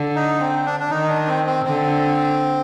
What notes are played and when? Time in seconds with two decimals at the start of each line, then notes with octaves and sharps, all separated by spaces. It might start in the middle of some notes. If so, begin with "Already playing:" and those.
Already playing: D3
0.15 D#4
0.40 C4
0.66 D4
0.80 D4
0.90 D#3 D#4
1.09 D4
1.28 C4
1.46 C4
1.66 D3 C4